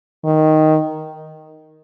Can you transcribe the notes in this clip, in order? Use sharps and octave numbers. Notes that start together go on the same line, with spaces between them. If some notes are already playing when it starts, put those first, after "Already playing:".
D#3